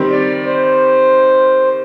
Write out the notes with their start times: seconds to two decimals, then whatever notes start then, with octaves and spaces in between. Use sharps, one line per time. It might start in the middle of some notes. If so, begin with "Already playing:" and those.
Already playing: D#3 G3 C4 G4
0.11 D5
0.44 C5